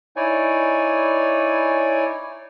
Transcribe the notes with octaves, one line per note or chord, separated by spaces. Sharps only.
D#4 E4 C#5 D5 G#5